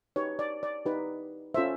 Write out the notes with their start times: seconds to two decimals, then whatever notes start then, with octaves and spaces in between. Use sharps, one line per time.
0.16 D#4 G4 B4 C#5
0.39 D5
0.63 D5
0.86 D#4 G4 B4
1.54 C#4 F4 A4 C5 E5